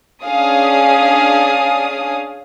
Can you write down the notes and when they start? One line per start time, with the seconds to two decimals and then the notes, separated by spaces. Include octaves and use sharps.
0.23 C#4 D4 G#4 F5 D#6